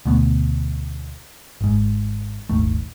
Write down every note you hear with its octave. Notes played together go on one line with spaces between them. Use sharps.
D2 B2 A3 B3
G#1 G#2
D#1 G#1 D#3 A3